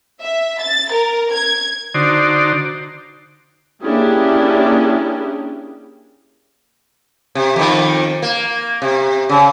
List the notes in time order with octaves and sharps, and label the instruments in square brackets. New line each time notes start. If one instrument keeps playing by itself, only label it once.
[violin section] E5
A6
A#4
G#6
[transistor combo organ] D3 D#4 F#4 C5 D5
[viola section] A#3 C#4 D4 E4 G4 G#4
[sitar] C3
F2 D#3
A#3
C3
C#3